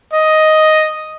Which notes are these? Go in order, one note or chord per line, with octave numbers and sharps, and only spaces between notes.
D#5